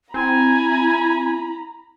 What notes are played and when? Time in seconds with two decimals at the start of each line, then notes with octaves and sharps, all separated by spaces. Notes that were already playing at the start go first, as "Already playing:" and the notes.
0.14 C4 E4 G#5 A#5 B5